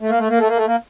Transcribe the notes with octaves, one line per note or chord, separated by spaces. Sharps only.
A3
A#3
A3
A#3
A3
A#3
A3
A#3